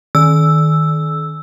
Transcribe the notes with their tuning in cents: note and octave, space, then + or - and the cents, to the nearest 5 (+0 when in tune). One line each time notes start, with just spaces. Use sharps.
D#3 +0 E6 +0